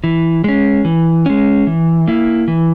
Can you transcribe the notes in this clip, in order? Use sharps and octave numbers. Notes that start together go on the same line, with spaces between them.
E3
G#3 C#4
E3
G#3 C#4
E3
A#3 E4
E3